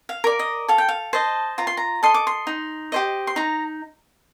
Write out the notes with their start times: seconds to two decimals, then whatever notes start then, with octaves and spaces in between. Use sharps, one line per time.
0.09 F5
0.24 A#4 D5
0.39 D#5
0.68 A4 F5
0.78 G5
0.88 F5
1.13 C5 D#5 A5
1.58 F4 A#5
1.67 C6
1.77 A#5
2.03 A4 D#5 C6
2.14 D6
2.27 C6
2.47 D#4
2.92 G4 C5 D#5
3.27 C6
3.36 D#4 A#5